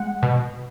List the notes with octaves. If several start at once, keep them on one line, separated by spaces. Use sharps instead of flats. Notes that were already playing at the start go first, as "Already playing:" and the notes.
Already playing: G#3 F#5
B2